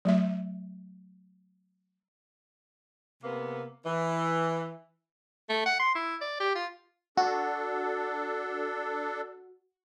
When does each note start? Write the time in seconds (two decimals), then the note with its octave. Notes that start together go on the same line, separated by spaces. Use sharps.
0.05 F#3 A3 E5
3.23 C3 A#3 B3
3.86 E3
5.49 A3
5.66 F#5
5.79 C6
5.95 E4
6.21 D5
6.40 G4
6.55 F4
7.17 D4 F#4 A4